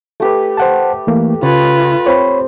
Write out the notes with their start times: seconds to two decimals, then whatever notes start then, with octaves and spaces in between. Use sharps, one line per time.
0.20 A3 G4 B4
0.57 C5 F#5 A5
1.07 E3 A3 A#3
1.43 C#3 F4 B4 C#5 A5 C#6
2.06 C4 C#5 B5